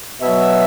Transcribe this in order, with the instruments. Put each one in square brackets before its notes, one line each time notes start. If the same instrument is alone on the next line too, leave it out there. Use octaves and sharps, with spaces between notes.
[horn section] B2 F#3 E5